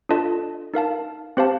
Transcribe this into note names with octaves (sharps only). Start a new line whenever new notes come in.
D4 F4 A4 D#5 A5
D#4 A#4 F5 A5
C4 G4 C5 F5 A5